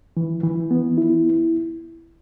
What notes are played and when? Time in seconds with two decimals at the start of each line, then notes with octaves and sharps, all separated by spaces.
0.17 E3
0.43 E3
0.71 B3
0.98 E4